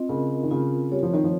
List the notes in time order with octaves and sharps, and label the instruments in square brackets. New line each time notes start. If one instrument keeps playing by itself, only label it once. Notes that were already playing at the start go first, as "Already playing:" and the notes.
Already playing: [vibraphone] C4 F4 D#5
[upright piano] C#3 [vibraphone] A#4
[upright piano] D#3
[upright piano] C#3 [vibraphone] F4
[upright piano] G3 [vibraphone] C#5
[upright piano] F3
D#3
F3